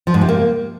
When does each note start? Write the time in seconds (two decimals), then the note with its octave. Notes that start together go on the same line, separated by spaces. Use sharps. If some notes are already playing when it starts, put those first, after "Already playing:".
0.07 F3
0.14 G#2
0.21 C3
0.29 A#3